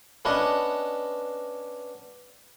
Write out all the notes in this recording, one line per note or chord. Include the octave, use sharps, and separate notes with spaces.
B3 C#4 D4 B4 D#5 F#5